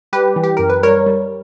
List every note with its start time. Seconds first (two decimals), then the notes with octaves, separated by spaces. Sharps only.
0.13 G3 G4 B4
0.36 E3
0.43 G4
0.57 F#2 A#4
0.70 B4
0.83 G3 A#4 C#5
1.06 G3